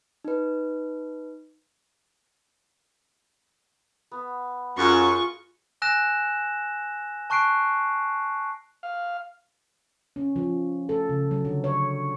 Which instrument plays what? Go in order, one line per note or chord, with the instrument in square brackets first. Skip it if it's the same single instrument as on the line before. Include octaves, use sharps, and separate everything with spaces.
[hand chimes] D#4 B4
[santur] B3
[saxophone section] F#2 [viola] F4 C#6 [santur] F#4 G#4
[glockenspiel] G#5 E6 F#6 A#6 E7
A5 C#6 F#6 C7 D7
[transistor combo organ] F5
[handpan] C#4
F3
A4
C#3
F#3
D3
C#5